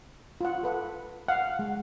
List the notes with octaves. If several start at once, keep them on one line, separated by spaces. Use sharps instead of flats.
F4 F#5
A4 B4 F#5
F5 F#5
G#3